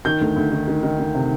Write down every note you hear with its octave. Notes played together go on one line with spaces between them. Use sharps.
D#3 G6
D2
D2
D#3
D#3
D#3
D#3
C3